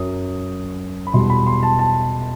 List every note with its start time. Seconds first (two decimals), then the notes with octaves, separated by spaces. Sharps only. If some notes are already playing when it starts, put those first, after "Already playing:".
Already playing: F#2 F#3 D#6
1.07 B5
1.13 E2 B2 G3 C6
1.30 B5
1.47 C6
1.63 A5
1.79 A5